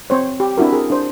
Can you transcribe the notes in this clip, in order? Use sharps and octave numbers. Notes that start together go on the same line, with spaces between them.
C4 C5 C#5
G4
C4 D4 E4 F#4 A#4
G#4 A#4
D4 C5